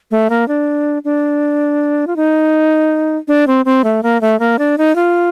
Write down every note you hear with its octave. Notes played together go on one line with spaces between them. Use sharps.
A3
A#3
D4
D4
F4
D#4
D4
C4
C4
A3
A#3
A3
A#3
D4
D#4
F4